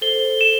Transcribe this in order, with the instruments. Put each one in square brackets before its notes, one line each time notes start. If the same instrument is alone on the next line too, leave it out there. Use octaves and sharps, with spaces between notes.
[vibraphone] A4 C5 [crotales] G7
[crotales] E7